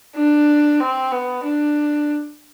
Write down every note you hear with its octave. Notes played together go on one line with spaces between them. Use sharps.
D4
C4
B3
D4